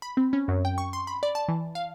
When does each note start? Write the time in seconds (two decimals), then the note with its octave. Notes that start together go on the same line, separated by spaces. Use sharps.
0.02 B5
0.17 C4
0.33 C#4
0.48 F#2
0.65 G5
0.78 C#6
0.93 C6
1.07 B5
1.23 D5
1.35 A5
1.48 E3
1.75 F5